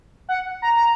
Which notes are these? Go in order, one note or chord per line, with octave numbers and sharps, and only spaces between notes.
F#5
A#5
A#5